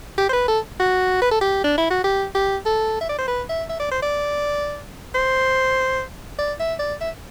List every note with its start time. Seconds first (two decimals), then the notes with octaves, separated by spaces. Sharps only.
0.18 G4
0.29 C5
0.33 B4
0.48 A4
0.80 F#4
1.22 B4
1.31 A4
1.41 G4
1.64 D4
1.78 E4
1.91 F#4
2.04 G4
2.35 G4
2.66 A4
3.01 E5
3.09 D5
3.18 C5
3.28 B4
3.49 E5
3.70 E5
3.80 D5
3.92 C5
4.03 D5
5.15 C5
6.38 D5
6.60 E5
6.79 D5
7.01 E5